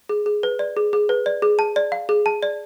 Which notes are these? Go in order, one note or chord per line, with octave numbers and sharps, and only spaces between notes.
G#4
G#4
B4
D5
G#4
G#4
B4
D5
G#4
A5
D5
F5
G#4
A5
D5